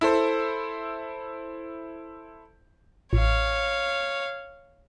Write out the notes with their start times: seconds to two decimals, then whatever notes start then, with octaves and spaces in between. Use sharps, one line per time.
0.01 E4 A4 C5
3.13 A1 C#5 F5